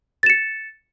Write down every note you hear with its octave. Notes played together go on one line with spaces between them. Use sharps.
A6 C#7 E7